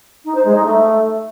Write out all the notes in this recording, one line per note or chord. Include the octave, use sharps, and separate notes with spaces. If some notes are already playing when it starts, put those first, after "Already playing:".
D#4
C5
G#3
D#4
A3